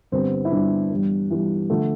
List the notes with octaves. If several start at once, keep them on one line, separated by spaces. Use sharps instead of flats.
G2 D3 G3 B3 C4
E4
G2 D3 G3 B3 D4
G2 E3 G3 B3
G2 E3 G3 B3
D3 F3 A3